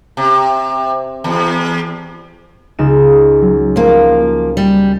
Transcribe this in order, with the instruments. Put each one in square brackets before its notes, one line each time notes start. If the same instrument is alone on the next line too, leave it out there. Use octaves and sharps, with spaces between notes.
[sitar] C3
E2
[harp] C#2 D#4 E7
F#3
[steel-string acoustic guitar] F3 A#3
G3